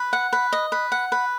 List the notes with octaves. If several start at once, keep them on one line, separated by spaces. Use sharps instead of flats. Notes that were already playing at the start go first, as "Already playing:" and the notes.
Already playing: B4
F#5
B4
D#5
B4
F#5
B4